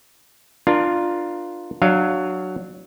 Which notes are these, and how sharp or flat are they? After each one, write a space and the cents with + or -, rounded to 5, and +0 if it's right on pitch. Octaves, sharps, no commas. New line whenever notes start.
D4 +25 F4 +0 A#4 +15
F#3 +5 D4 +30 F5 +0